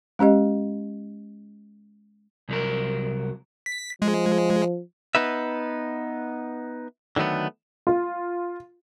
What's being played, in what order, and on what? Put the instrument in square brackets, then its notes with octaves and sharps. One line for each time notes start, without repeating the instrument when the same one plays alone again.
[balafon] G#3 C#4 G4 D#5
[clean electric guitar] C2 F#3 A#4
[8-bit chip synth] B6
[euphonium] F3 [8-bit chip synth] G#3
[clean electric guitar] B3 D#4 B4 E5
D3 D#3 F#3 A3 B3
[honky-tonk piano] F4